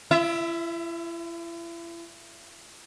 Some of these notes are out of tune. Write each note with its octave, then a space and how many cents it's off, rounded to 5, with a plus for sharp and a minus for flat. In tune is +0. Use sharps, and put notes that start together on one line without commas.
E4 +40 E5 +0